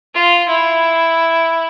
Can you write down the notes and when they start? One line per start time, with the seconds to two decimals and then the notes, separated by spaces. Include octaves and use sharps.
0.15 F4
0.48 E4